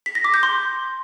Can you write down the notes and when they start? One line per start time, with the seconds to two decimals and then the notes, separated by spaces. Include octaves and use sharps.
0.06 B6
0.15 A#6
0.25 D6
0.34 G6
0.43 C6